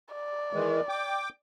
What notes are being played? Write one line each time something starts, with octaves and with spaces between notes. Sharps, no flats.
D5
D#3 E3 G#3
G5 D6